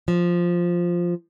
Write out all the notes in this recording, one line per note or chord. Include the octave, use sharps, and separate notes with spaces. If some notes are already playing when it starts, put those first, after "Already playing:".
F3